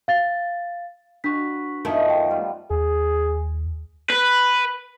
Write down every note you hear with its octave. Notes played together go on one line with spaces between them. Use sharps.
F5 A6
D4 F#4 B4 B6
F#2 D#3 F3 A3 B3 D#4
G5
G3 F4
D#2 G#4
B4